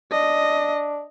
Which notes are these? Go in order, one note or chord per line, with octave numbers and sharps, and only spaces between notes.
D4 D#5